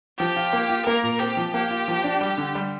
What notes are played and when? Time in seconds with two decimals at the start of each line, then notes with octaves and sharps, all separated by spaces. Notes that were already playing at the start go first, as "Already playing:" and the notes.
0.19 F3 G4
0.36 F4
0.53 A#3
0.70 F4
0.86 A#3 A#4
1.03 A#2
1.20 C4 G4
1.37 F3
1.54 A#3 G4
1.71 F4
1.88 F3
2.04 D4
2.21 G3 G4
2.38 D3
2.55 G3